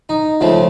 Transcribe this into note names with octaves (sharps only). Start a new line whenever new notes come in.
D#4
C#2 C#3 F3 A3